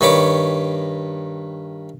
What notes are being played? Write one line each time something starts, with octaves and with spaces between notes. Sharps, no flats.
G2 D#3 C#5 B5 C#6 D6